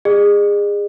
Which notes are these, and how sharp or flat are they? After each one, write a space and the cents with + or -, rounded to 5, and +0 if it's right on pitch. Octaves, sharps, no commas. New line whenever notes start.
G#4 -25 D#5 -45